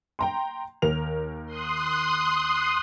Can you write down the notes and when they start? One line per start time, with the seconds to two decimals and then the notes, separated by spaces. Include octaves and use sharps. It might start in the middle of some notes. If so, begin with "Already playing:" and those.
0.19 G5 A#5 C6
0.82 D#2 A#4 F7
1.46 C6 D#6 F#6